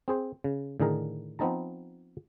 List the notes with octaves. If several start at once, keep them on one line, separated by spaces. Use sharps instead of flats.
C4 G#4 C5
C#3
A2 D3 D#3 G#4 A#4
F3 B3 C4 D#4 A5 A#5